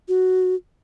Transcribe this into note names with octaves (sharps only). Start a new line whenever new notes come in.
F#4